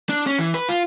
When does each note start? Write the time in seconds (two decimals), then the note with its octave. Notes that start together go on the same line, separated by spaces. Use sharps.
0.09 D4
0.27 C#4
0.39 E3
0.55 B4
0.69 F4